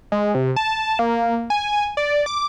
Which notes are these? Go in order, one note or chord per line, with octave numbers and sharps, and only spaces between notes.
G#3
C3
A5
A#3
G#5
D5
D6